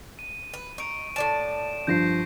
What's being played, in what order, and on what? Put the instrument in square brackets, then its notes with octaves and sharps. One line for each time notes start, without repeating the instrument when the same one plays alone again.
[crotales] D#7
[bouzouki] B4
[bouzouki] D#4 [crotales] C#6 D7
[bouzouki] A2 D5 A5 [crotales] E7
[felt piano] G2 F3 [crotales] G6 A#6 C7